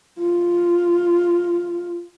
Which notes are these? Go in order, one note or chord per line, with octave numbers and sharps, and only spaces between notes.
F4